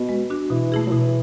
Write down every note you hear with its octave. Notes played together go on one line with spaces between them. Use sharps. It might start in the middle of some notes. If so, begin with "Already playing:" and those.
Already playing: B2
G#3
D4 F#4
B2 E3
A3 E4 G#4
F#3
B2 E3